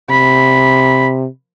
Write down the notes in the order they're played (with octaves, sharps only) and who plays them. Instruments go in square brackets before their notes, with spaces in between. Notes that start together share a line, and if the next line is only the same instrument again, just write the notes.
[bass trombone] C3 [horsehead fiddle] B5